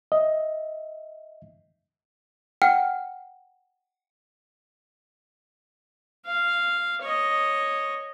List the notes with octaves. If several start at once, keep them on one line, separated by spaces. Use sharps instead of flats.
D#5 E5
F#5 G5 F6
F5
C#5 D#5